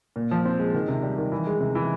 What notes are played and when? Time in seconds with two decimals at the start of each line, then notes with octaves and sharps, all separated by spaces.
0.16 A#2
0.31 F3
0.45 C4
0.59 G#3
0.74 D#3
0.88 C3
1.03 G3
1.18 D#3
1.32 E3
1.47 G#3
1.60 C3
1.75 E3